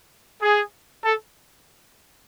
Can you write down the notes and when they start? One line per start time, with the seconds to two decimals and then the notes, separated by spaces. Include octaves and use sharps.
0.42 G#4
1.02 A4